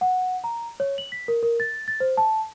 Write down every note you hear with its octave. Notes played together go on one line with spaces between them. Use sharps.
F#5
A#5
C#5
F#7
B6
A#4
A#4
A6
A6
C5
A5